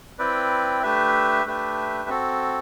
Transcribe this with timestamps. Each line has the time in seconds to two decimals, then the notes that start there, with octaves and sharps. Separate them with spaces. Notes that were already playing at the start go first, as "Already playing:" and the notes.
0.19 C4 E4 B4 D5 G5
0.83 A3 D4 G4 B4 E5
1.45 A3 D4 G4 B4 E5
2.09 C4 F#4 A4